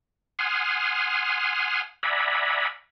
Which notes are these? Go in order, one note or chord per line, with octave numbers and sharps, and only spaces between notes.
F#5 G#5 C6 D#6 F6
D5 E5 F#5 G#5 A#5 B5